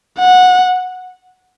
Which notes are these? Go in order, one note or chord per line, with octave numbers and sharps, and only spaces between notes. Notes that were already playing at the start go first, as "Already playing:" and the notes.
F#5